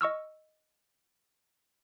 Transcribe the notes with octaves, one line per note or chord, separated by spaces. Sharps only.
D#5 C#6 E6 F6